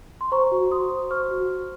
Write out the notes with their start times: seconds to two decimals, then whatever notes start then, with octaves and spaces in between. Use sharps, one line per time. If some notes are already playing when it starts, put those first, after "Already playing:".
0.21 C6
0.32 C5 A#5 C#6
0.52 F#4
0.71 F#4 C6 D#6
0.91 C5
1.10 C5 C#6 F6
1.31 F#4
1.50 F#4